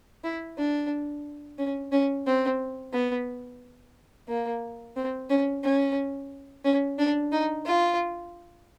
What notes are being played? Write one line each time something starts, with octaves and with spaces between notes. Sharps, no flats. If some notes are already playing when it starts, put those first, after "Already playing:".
E4
D4
C#4
C#4
C4
B3
A#3
C4
C#4
C#4
C#4
D4
D#4
F4